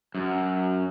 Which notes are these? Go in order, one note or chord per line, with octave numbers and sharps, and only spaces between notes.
F#2